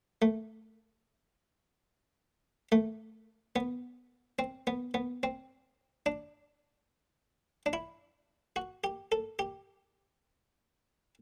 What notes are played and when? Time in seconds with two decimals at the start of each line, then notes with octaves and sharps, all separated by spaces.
0.22 A3
2.72 A3
3.56 B3
4.39 C4
4.67 B3
4.94 B3
5.23 C4
6.06 D4
7.66 D4
7.73 E4
8.56 F#4
8.84 G4
9.12 A4
9.39 G4